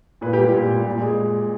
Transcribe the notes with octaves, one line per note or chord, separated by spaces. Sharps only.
A#2 B4
G4
G3
G4
A#2
G3
A#2
G#3